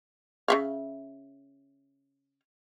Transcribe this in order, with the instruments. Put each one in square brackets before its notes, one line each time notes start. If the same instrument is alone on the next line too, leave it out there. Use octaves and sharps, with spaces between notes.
[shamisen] C#3 E5 F5